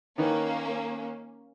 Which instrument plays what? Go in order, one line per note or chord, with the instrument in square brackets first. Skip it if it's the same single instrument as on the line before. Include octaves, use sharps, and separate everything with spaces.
[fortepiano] D#3 D#4 B4 [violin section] A#3 C#4